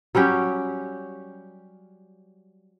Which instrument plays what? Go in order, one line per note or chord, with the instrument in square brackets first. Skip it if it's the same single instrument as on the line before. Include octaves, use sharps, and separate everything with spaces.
[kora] F#3 G3 C#4 G4